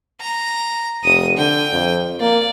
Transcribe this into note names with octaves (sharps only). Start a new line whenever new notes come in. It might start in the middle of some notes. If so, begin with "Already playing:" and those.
A#5
F1 D#6 D#7
D3 G5
F2
A#3 D5